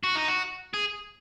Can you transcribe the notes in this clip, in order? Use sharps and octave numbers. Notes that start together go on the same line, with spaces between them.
F#4
D#4
F#4
G#4